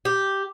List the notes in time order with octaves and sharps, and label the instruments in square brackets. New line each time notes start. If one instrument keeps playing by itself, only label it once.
[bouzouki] G4